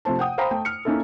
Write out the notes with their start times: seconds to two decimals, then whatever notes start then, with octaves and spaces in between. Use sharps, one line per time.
0.05 C3 F3 A3 C5 A5
0.19 F#5 G5 D#6
0.38 C5 F5 G5 A#5 B5
0.51 A3 G5
0.65 F6 C#7
0.85 A#3 C#4 D#4 E4 A4